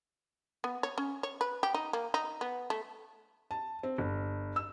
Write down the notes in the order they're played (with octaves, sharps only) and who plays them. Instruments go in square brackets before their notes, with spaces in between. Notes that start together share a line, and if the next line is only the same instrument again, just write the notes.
[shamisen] B3
C#5
C#4
C#5
B4
G4
D#4
A#3
D#4
B3
A3
[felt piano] A5
C4
G1
E6